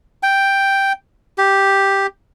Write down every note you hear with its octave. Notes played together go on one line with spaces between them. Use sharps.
G5
G4